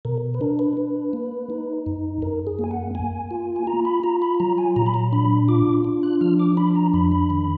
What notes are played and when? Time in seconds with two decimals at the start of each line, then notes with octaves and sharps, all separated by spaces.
0.05 B2 A#4
0.34 B4
0.41 D4 A#4
0.59 B4
0.77 D4
1.13 A#3
1.50 D#4
1.86 F#2
2.22 F#2 A#4
2.47 G#4
2.59 A#3
2.64 G#5
2.71 F#5
2.95 A#3 G#5
3.31 F4
3.56 G#5
3.67 F4 A#5
3.85 B5
4.03 F4 A#5
4.22 B5
4.40 F#3 A#5
4.58 G#5
4.76 A#2 A#5
4.86 B5
4.94 A#5
5.12 D4 B5
5.48 F4 D6
5.85 D4
6.03 F#6
6.21 F3 F6
6.39 D6
6.57 D4 B5
6.75 A#5
6.94 F2 B5
7.12 B5
7.30 D#3